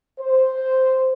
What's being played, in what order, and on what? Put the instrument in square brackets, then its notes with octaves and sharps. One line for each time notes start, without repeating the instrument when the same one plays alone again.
[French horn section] C5